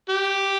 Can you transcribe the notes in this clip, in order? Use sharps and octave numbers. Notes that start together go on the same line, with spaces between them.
G4